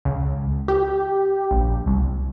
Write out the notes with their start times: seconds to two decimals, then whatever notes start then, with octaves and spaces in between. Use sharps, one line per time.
0.05 C#2
0.68 G4
1.51 A#1
1.86 C2